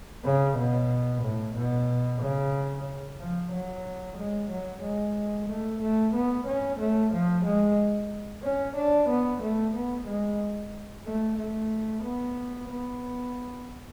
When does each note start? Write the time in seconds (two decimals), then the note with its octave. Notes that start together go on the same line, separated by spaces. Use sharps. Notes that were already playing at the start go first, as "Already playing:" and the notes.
0.25 C#3
0.57 B2
1.23 A2
1.56 B2
2.21 C#3
3.20 F3
3.53 F#3
4.17 G#3
4.51 F#3
4.83 G#3
5.49 A3
5.82 A3
6.14 B3
6.47 C#4
6.80 A3
7.13 F3
7.45 G#3
8.43 C#4
8.76 D4
9.09 B3
9.42 A3
9.74 B3
10.07 G#3
11.06 A3
11.38 A3
12.04 B3
12.69 B3